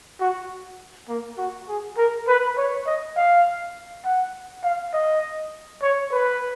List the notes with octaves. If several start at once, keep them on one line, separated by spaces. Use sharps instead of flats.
F#4
A#3
F#4
G#4
A#4
B4
C#5
D#5
F5
F#5
F5
D#5
C#5
B4